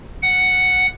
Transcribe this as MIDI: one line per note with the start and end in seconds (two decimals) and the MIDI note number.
0.23 0.86 78